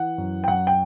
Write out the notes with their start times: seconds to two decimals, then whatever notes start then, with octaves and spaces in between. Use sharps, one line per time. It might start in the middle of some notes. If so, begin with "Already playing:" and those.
Already playing: E3 F#5
0.18 F#2
0.44 G5
0.48 F#2 F#5
0.67 G5